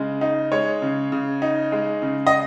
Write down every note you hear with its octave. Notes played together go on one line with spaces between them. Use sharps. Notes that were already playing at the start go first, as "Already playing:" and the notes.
Already playing: C#3 G#3
D#4
G#3 C#5
C#3
C#3
D#4
G#3
C#3
D#5